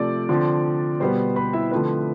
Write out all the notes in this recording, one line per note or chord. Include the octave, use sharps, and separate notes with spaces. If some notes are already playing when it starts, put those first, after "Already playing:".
Already playing: C3 F3 A3 D5 D6
D3 F3 C4
B2 G3 B3 C5 C6
B4 B5
E4 E5
D3 F3 A3 C4 B4